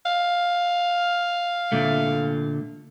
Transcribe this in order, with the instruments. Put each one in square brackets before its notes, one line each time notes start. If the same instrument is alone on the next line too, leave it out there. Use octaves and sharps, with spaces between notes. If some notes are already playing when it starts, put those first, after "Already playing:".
[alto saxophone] F5
[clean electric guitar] A#2 D3 A3